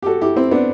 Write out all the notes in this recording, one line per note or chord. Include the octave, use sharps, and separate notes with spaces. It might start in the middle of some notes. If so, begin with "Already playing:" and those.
G4
F#4 A4
E4 G4
C4 E4
B3 D4